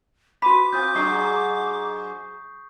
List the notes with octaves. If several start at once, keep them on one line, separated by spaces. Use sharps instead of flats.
F#4 B4 B5 D6 B6
C4 F4 D#6 G6
G#2 F#3 D4 C#6 C7